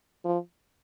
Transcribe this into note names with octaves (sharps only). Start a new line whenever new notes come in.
F3